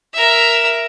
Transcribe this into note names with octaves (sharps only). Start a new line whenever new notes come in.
A#4 E5